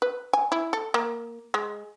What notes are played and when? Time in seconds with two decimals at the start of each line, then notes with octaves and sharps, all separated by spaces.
0.02 B4
0.33 G#5
0.52 E4
0.73 A4
0.94 A#3
1.54 G#3